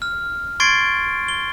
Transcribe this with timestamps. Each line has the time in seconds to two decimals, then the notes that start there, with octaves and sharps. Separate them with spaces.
0.02 F6
0.60 C6 C#6 G#6 A6 C7 D7
1.28 G7